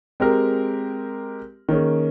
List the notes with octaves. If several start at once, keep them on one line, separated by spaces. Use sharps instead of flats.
G#3 C4 G4 A#4
D#3 A#3 C#4 G#4